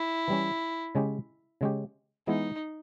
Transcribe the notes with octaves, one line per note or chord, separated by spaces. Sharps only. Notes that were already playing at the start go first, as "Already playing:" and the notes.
Already playing: E4
E3 G3 C#4
C#3 G#3 C#4 G4
C#3 G#3 C#4 G4
E3 G#3 B3 D#4 E4